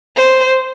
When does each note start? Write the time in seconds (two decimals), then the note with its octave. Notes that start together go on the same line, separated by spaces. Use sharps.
0.16 C5